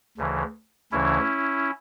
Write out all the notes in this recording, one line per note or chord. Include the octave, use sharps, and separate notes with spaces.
D2 C#3 E3
D2 C#3 E3 C#4 E4